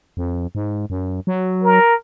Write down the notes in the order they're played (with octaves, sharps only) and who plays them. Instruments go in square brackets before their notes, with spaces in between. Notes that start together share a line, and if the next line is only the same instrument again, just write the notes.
[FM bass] F2
G#2
F#2
F#3
[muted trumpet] A#4